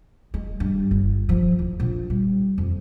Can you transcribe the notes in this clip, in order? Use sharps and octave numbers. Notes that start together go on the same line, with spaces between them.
G#3
G2
G1
F3
E2
A#1
G3
F2